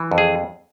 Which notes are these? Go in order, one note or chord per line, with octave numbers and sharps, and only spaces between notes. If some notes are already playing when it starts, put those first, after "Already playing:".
Already playing: E3
F2
G#4